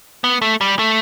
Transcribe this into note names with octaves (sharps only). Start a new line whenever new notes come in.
B3
A3
G3
A3